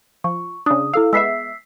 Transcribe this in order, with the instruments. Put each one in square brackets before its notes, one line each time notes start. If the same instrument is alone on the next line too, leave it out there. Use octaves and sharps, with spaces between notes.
[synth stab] F3 [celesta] C#6
[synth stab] C#3 D4 [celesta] D#6
[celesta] E4 A4 E6 [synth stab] F5
[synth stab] G#3 B3 E5 [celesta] E6 B6 C7